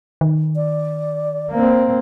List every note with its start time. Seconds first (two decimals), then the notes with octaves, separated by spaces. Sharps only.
0.21 D#3
0.56 D5
1.51 A#3 C4